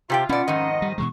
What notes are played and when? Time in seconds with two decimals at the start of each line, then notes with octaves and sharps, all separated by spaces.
0.10 C3 F4 G4 G5
0.29 B2 C#4 D5 F#5
0.48 F2 G#2 D#3 D#5
0.82 G3
0.98 B2 E3 G#3 C#6